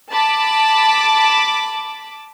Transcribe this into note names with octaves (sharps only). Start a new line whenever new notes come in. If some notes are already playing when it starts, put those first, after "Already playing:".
A5 B5 D6